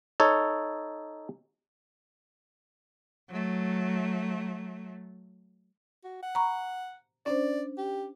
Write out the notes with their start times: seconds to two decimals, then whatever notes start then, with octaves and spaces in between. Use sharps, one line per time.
0.20 D#4 A4 C#5
3.29 F#3 A3
6.04 F#4
6.23 F#5
6.35 A#5 B5 C#6
7.26 C#4 D4 C5 D5
7.78 G4